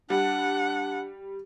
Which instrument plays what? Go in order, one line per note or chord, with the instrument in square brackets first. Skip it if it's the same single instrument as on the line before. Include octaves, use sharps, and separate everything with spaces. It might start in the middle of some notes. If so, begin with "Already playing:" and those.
[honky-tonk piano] G3 [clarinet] D4 [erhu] F#5